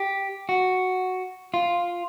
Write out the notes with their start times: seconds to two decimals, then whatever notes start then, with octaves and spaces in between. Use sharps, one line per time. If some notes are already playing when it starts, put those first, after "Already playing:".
Already playing: G4
0.49 F#4
1.54 F4